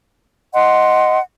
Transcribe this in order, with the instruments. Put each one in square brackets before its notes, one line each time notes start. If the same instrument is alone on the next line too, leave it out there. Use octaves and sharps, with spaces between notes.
[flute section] D#5 F#5 C6